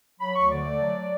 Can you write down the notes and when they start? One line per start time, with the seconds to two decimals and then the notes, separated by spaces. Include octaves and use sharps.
0.20 F#3 B5
0.35 D2 C#6
0.51 D3 D5
0.66 A3
0.81 F#3